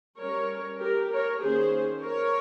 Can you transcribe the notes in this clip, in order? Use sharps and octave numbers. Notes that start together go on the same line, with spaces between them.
G3 C#4 A#4 C#5
G4 A#4
A#4 C#5
D#3 A#3 C#4 G#4 C5
A#4 C#5